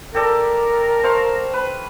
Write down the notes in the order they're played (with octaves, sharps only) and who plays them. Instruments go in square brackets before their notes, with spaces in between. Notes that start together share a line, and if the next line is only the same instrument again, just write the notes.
[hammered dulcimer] G4 A4 D5 [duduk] A#4
[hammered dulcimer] C5 F5 C#6
B4